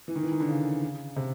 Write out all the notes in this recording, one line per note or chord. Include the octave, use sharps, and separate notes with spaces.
E3
D#3
E3
D#3
D3
C#3
C3